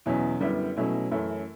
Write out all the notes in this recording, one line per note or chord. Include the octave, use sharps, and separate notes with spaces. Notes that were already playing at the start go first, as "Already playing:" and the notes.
E2 B2 F#3 C#4 E4
F#2 D3 G3 B3 E4
B2 F#3 A3 C#4 E4
F#2 E3 A3 C#4 E4